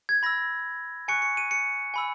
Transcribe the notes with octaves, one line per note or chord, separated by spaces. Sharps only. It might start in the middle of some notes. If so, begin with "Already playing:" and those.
G#6
B5 E6 A#6
G#5 C#6 F#6 C#7
C#7
D#7
C#7
G#5 B5 E6